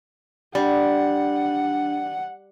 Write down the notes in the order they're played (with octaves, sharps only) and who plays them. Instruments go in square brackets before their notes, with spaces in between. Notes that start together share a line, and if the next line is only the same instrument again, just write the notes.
[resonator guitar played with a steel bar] G3 [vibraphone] D4 [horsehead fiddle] F#5